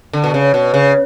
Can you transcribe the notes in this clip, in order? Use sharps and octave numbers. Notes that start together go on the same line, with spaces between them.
D3
B2
C#3
B2
C#3